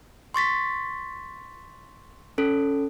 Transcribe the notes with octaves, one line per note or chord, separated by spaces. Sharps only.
C6 C#6 A6 B6
C#4 A4